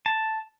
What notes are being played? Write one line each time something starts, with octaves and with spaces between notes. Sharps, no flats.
A5